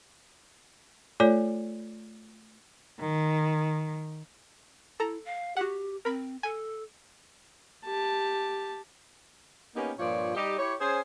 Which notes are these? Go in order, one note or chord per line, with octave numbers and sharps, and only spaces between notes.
A3 F4 A4 C#5 D5
D#3
E4 A4 A#5
F5
F#4 G4 F#5
C4 A#4 B5
A4 G#5
G4 A5
A#3 B3 C#4 D#4 G4
G2 A#2 F3 C#5 D5
G3 D#4 G4
E4 G4 C#5
C#4 G#4 C5